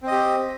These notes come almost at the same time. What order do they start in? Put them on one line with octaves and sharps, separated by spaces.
C4 D#5 G4